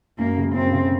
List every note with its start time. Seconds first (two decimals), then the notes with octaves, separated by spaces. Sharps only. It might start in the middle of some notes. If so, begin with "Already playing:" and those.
0.18 F#2 A#3
0.37 C#3 F#3
0.54 F#2 C4
0.72 C#3 F#3